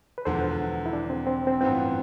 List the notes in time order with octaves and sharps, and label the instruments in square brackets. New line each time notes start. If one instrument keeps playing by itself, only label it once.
[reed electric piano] B4
[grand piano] E1 E2 D3 F3 B3 [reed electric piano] A4 C5
[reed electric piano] E4
D4
C4
C4
C4
[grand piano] A1 G2 E3 B3 F4 [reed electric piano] C4